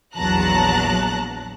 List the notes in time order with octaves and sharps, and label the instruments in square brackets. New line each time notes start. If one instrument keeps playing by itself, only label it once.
[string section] A#1 E2 F#3 A5 A#5 F#6